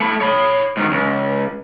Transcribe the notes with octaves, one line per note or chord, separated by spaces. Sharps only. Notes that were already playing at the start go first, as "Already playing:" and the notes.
A3 B5
C#5 B5
G#2 D#3
C#2